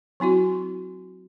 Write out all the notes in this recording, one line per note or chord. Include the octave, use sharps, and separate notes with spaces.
F#3 C4 E4 F#4